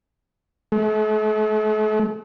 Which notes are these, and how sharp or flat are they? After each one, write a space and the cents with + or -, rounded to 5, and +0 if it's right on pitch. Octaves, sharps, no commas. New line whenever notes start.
A3 -40